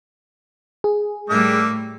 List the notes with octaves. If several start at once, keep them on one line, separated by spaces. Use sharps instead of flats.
G#4
A2 G3 A3 A#3 D4 E5